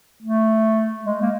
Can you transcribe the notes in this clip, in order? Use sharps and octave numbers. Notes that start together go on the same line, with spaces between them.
A3
G#3
A#3